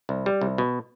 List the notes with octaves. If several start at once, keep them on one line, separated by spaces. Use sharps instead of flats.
C2
G3
C2
B2